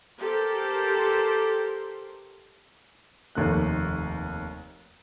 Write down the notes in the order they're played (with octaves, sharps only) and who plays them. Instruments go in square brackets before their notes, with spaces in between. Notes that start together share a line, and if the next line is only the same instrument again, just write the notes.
[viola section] G4 A4 A#4 C5
[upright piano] F1 D#2 A3 F#6